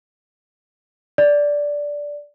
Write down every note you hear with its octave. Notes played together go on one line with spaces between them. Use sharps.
D5